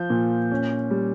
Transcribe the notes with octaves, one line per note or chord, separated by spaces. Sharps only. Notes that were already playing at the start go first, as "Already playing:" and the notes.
Already playing: F3 G6
A#2
C#4
G3